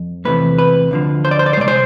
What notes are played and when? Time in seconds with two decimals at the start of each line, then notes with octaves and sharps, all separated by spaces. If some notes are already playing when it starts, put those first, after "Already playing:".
Already playing: F2
0.25 E2 C3 E3 A3 B4
0.58 B4
0.91 D2 D3 F3
1.25 C5
1.31 D5
1.39 C5
1.46 D5
1.53 C5
1.57 C2 B2 G#3 D5
1.68 C5